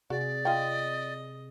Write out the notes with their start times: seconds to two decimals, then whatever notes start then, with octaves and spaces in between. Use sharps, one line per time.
0.10 C3 F#4 G#4 D5
0.45 F4 D#5 G5